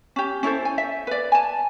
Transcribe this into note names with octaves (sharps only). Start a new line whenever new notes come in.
C#4 G4
C#4 E4 A4 C5
G#5
E5
B4 D5
G#5 A5